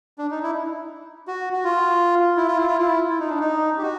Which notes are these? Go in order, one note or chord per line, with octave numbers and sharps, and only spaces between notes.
D4
D#4
E4
F#4
F#4
F4
E4
F4
E4
F4
E4
E4
D#4
D4
D#4
G4
F#4